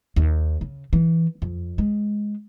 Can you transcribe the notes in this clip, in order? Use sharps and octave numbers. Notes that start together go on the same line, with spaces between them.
D#2
C#3
E3
F2
G#3